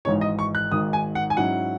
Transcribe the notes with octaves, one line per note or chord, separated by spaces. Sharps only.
G#1 G#2 E3 G#3 D#4 C#5
D#5
C#6
F#6
G#1 G#2 D#3 D#6
G#5
F#5
G#5
G#2 F#3 C#4 E4 F#5